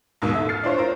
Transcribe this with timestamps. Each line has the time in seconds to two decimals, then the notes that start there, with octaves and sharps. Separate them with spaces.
0.22 A#1 D#2 G#2 B2
0.34 A4 E5
0.49 F6 A6 C7
0.64 D4 F4 C5 C#5
0.78 F4 A#4 C5